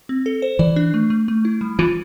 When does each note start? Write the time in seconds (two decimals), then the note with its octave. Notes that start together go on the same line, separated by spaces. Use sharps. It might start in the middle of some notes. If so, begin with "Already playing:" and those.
0.09 C4
0.26 A4
0.42 C5
0.59 E3 D5
0.76 D4
0.94 A3
1.10 A3
1.28 A3
1.45 E4
1.61 G3
1.79 E3 F4